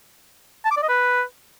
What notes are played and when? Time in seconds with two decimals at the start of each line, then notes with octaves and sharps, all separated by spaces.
0.65 A5
0.71 D6
0.77 D5
0.83 D#5
0.89 B4